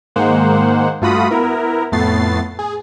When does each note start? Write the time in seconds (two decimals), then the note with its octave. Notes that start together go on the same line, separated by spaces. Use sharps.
0.16 G#2 D#3 G#3 A#3 C5 F#5
1.01 G2 A3 F4 F#4 B5 D#6
1.30 B3 E4 A#4
1.92 F2 A2 A3 B3 A6 C7
2.59 G#4